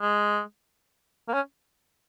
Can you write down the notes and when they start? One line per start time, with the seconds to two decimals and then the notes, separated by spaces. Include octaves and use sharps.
0.01 G#3
1.28 A#3
1.34 C#4